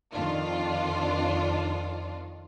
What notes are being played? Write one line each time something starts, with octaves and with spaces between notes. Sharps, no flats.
F2 D#3 D4 F4